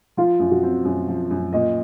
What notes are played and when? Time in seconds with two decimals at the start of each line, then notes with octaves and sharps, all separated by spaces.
0.17 F3 F4
0.40 F#2
0.51 F#4
0.63 C4
0.85 F#2
1.08 F3
1.31 F#2
1.53 A#2 D#5